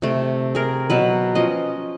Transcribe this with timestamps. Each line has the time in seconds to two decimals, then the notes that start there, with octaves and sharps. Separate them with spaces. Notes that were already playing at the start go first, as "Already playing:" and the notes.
0.02 C3 A3
0.55 G#4 A#4
0.90 B2 F#3 B4
1.35 F3 C#4 D#5